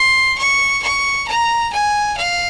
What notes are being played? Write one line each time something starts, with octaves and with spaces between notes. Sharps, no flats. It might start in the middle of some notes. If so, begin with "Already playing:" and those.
Already playing: C6
C#6
C#6
A#5
G#5
F5